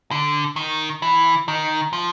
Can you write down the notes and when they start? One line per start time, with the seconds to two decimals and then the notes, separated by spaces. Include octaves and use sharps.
0.11 D3
0.56 D#3
1.02 E3
1.48 D#3
1.93 F3